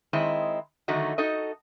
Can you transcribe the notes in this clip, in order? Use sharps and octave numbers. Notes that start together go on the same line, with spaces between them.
D#3 G#3 C4 E4 D#5
D3 D#3 F#3 A3 D#4 F#4
D#4 F#4 A4 D#5